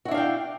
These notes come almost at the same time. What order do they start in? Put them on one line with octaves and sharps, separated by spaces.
F#4 E4 D4 F5 G5